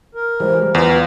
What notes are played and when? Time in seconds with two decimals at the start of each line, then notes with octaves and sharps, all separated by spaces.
0.15 A#4
0.40 E3 G3 G#3 C5
0.75 E2 F4 B4 D5 F5